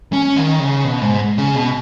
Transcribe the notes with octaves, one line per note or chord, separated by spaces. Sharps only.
C#4
D#3
C#3
B2
G#2
C#3
B2